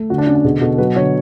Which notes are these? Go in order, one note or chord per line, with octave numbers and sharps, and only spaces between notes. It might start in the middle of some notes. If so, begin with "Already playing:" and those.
Already playing: A3
D3 F#4
D4
D3 C#4
D4
B2 G#4
B2 A4
F#3 B4
D3 C#5